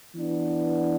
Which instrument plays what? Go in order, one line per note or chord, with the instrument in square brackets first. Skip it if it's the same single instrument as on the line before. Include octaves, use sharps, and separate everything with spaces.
[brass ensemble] E3 B3 D4